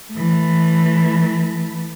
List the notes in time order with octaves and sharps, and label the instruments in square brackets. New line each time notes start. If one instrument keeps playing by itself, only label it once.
[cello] E3 A3